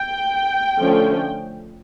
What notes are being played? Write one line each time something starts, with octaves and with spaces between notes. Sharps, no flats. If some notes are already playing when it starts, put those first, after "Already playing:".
Already playing: G5
D3 F3 A3 C#4